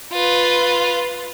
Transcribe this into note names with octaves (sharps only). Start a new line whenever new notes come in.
F4 B4